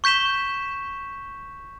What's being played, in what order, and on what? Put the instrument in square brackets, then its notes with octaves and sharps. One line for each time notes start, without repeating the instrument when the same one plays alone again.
[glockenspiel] C#6 G6 B6 E7 G7